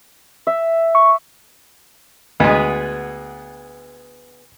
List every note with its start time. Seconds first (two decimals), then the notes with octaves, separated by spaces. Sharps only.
0.47 E5
0.95 C#6
2.40 D2 G#3 B3 G#4